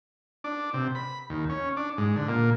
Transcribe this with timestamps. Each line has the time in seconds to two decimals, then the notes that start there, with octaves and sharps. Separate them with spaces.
0.44 D4
0.74 C3
0.95 B5
1.30 D#2
1.49 C#4
1.77 D4
1.98 G#2
2.16 D3
2.29 A#2